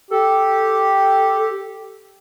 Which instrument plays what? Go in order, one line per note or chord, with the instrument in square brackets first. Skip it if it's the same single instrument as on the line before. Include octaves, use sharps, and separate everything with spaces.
[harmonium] G4 [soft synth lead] A4